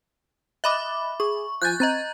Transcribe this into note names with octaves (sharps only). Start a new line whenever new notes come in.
D#5 E5 B5 D6 F#6
G#4 C#6
F3 G#5 F#6 G6 A6
C4 D#5 A#5 A6